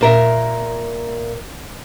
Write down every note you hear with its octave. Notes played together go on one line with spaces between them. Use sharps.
A#2 A#4 E5